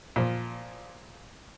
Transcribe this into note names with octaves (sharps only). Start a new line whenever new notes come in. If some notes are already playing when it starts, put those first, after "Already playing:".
A#2 F3